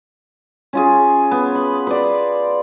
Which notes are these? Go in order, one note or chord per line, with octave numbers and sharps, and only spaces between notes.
C#4 F4 G#4
B3
B5
B4 C5 D5